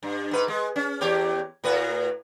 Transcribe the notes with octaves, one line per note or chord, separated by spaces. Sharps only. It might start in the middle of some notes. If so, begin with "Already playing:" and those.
G2
G#2 B4
G#3
C#4
E2 G4 C#5
A2 F#4 B4